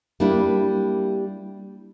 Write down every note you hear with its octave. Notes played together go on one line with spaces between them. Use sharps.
G3 A#3 D4 E4